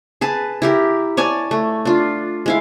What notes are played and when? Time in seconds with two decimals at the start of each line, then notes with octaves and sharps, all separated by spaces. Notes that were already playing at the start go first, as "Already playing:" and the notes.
0.21 G#4 B4 A5
0.62 E4 G4 A#4
1.17 C#5 D5 G#5 A5
1.51 A3
1.85 D4 F4
2.46 G#3 E4 F5